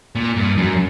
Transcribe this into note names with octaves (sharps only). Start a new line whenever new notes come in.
A#2
G2
F#2